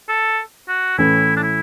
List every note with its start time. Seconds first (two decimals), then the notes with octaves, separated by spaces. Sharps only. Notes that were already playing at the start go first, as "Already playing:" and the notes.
0.09 A4
0.68 F#4
0.98 A2 E3 A3 C#4 E4
1.37 D4
1.43 E4